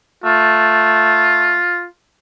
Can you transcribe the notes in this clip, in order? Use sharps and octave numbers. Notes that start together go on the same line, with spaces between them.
A3 F4